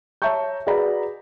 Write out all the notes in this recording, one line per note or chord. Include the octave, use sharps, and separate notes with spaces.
C#5 E5 A5 A#5 C#6 G6
F#4 G#4 B4 D5 A#5 B5